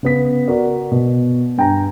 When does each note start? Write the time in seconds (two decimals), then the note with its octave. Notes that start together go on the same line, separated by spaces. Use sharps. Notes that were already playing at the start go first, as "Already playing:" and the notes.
0.03 C#3 B3 B6
0.48 F#4 A#4 D5
0.91 B2
1.58 G2 G5 G#5 A#5